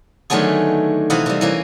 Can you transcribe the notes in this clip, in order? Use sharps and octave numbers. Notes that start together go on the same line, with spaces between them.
D3 D#3 F#3 A3 B3 G#4
C3 E3 D#5 F5 F#5 B5
C3 G3
E3 A#3 C#4